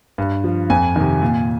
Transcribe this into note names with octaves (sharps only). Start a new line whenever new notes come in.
G2
F3
F2 G#5
C3 D#3
A#2